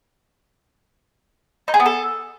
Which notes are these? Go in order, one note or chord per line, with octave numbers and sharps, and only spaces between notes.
D#4
G#4
B3
A4